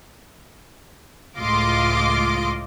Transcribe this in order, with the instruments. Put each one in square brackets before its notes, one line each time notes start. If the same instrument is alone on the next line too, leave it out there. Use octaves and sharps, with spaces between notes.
[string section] C#2 A2 F4 D#5 C6 D6